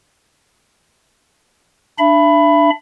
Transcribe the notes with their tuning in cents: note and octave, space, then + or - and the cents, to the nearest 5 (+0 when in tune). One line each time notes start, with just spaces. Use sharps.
D4 +10 E5 +35 B5 +0